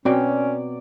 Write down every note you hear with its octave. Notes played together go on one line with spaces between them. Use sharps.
B2 F#3 C4 C#4 D5 G5